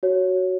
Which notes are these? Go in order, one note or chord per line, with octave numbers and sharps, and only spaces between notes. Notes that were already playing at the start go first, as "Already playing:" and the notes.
F#4 C#5